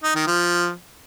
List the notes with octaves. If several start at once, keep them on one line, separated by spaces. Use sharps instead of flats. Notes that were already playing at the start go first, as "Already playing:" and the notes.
D#4
D#3
F3